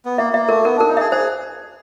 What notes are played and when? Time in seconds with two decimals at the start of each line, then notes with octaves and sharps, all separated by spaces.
0.05 B3
0.18 A#3 E5
0.33 A#3 E5
0.49 A3 A#4
0.64 B3 A#4
0.77 D4 A#4
0.88 D#4
0.97 G#4 E5
1.11 G#4 C5